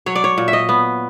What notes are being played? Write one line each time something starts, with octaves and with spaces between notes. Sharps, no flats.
F#3 C#5
D5
C#5
A#2
E5
D#5
B3